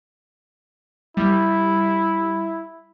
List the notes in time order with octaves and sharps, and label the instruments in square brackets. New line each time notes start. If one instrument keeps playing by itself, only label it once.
[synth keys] G3 [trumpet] E4